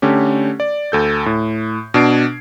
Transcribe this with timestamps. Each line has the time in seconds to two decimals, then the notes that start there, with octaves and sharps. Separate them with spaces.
0.02 D3 A3 C#4 G4
0.60 D5
0.92 D2 A4 G6
1.26 A2
1.94 B2 D4 G#6 C7 D7